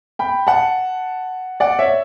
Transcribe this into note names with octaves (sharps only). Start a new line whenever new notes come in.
G5 B5
F#5 A5
D5 F#5
C#5 E5